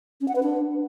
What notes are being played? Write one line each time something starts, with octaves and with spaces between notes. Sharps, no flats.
C#4
F#5
B4
D4